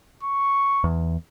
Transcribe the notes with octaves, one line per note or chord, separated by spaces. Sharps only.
C#6
E2